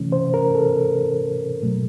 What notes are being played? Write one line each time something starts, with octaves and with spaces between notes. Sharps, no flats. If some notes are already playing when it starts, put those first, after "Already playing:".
Already playing: C3 E3 A3 C#4
C5
A#4
A4
B2 F#3 A3